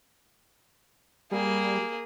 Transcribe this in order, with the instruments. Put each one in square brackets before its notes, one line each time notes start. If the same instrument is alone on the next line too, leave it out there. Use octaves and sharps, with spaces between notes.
[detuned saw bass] G3 [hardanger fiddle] A#3 G#4